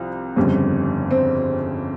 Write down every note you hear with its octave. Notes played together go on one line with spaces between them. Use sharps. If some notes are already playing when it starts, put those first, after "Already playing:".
Already playing: C2 C3 F3
G1 F2 C#3 G3
C4